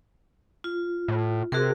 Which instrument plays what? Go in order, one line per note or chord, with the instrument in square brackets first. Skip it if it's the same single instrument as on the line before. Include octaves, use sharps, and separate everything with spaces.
[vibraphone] F4
[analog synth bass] A2
[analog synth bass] C3 [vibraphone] F#4 G#4 A#4